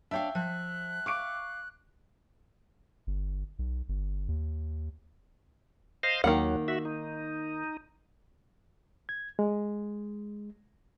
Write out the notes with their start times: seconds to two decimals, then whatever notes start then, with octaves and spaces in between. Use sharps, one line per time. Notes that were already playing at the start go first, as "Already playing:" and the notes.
0.11 D4 C#5 E5 F5 G5
0.35 F3 F#6
1.06 F5 C#6 D6 D7
3.07 G1
3.59 B1
3.89 G1
4.28 D#2
6.03 C5 D#5 F5
6.24 D#2 D#3 F#3 A#3 F#5
6.68 F#4 E5
6.85 D#4
9.09 G#6
9.39 G#3